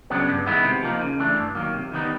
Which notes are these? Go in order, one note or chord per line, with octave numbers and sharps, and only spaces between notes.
C#3 F#3 B3 D4
G2
D#3 G#3 B3 E4
C3
F3 A#3 D#4
C#3
E3 A3 D4
G2
D#3 F#3 A#3
C3
D#3 G3 B3 D#4